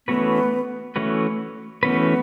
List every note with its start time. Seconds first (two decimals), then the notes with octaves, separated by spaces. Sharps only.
0.07 E3 A3 B3 C#4 F#4 B4
0.96 E3 A3 C#4 F#4 B4
1.83 E3 A3 B3 C#4 F#4 B4